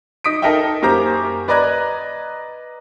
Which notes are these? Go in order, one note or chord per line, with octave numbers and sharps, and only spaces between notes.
D#4 D#6 B6 D7
D#4 A4 A#4 D#5 E5 G5
F#2 A#3 G4 A#4 C5 A#5
B4 D5 D#5 A#5 F#6 G#6